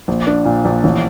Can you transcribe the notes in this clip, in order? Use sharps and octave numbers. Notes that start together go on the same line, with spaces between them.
A#1
D4
A#2
A#1
A1